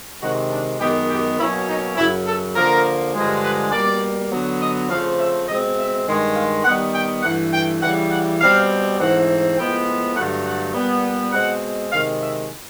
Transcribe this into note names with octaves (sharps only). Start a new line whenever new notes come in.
C3 D#3 G#3 F#4
D4
F#2 D#3 G#3 B3 G4
G4
B2 F#3 A#3 C#4 E4
D#4
F#2 C#3 F#3 E4
A4
D3 F3 A#3 A#4
G2 D3 F3 G#3
B4
B2 G3 A#3 D5
D3 F#3 B3
D#5
C#3 F3 A3 C4 F5
E5
B2 G#3 C4 D#5
E5
G2 D#3 G#3
F5
D#3 G3 B3 F#5
G5
G2 E3 A3 F#5
G5
C#3 E3 G3 F#5
F#5
B2 G3 C4 F5
G#2 E3 A3 C4 F#5
A2 F3 G#3 B3 G5
G2 D3 F#3 A3 F#5
F#5
A#2 G3 B3
B2 G#3 C4 F#5
C3 D#3 G#3 F5
E5